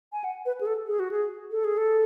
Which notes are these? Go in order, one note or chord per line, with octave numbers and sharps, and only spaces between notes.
G#5
F#5
B4
G#4
A4
G#4
F#4
G#4
A4
G#4
A4